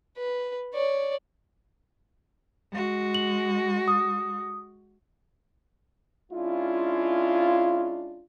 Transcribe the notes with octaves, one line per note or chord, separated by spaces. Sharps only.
B4
C#5 D5
G#3 F#4
F#7
D#6
G#3 C#4 D4 E4 F4